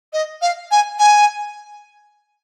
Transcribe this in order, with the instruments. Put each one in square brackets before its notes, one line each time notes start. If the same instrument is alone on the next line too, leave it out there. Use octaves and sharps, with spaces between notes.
[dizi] D#5
F5
G#5
G#5